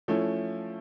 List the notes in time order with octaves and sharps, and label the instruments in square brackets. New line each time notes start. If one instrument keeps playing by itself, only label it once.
[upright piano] F3 A3 C#4 E4